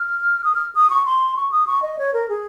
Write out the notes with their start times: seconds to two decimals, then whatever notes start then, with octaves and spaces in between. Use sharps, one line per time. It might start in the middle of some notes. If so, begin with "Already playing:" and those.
Already playing: F6
0.44 D#6
0.54 F6
0.75 D#6
0.90 C#6
1.05 C6
1.36 C#6
1.51 D#6
1.67 C#6
1.82 D#5
1.98 C#5
2.13 A#4
2.29 G#4